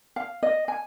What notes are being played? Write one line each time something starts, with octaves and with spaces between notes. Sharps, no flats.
F5
D#5
G#5